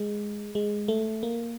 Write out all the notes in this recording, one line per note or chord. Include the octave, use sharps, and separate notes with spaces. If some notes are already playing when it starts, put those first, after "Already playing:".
Already playing: G#3
G#3
A3
A#3